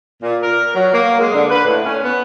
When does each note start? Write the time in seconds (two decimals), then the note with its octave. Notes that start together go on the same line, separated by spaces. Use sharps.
0.22 A#2
0.42 A#4
0.74 F#3
0.93 A#3
1.19 G#3
1.33 D3
1.50 B4
1.65 A2
1.85 C#4
2.03 B3